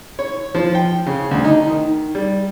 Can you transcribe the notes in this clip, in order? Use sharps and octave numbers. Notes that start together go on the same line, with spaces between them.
C#5
F3
G5
C#3
D2
D#4
D#3
G3